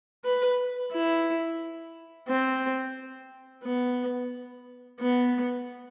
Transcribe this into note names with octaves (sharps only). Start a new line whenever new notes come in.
B4
E4
C4
B3
B3